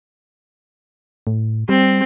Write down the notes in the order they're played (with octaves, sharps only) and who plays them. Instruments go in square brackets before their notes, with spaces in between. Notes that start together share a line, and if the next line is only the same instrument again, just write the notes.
[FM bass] A2
[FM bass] G3 [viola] C4